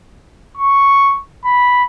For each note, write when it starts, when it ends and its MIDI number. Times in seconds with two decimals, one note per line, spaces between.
0.57 1.19 85
1.45 1.84 83